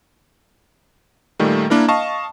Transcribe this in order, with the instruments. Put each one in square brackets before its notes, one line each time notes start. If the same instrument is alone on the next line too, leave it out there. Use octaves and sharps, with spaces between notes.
[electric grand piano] A#2 D#3 G3 A3
A#3 D4 E4 A#4
D#5 F5 A5 C#6